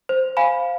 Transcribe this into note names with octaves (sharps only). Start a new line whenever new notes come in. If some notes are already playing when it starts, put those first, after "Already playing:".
C5
F5 G#5 B5